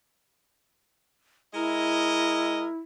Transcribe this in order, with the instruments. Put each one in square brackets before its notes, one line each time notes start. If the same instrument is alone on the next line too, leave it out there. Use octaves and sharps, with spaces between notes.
[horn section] G#3 A#4 D#5 [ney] E4